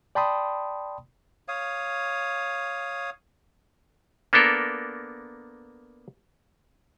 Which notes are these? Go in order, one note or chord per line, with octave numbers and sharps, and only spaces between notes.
D5 G5 A5 B5 C6 D#6
C#5 F5 D#6
A#3 B3 D4 A4 A#4